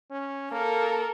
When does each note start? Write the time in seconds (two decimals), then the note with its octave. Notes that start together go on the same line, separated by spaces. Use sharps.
0.11 C#4
0.52 A#3 A4 A#4